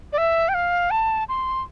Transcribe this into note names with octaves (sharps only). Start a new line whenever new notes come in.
D5
E5
G5
F5
A5
C6